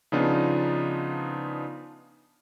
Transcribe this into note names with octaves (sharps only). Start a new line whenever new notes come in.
C#3 F3 B3 D4 D#4 F4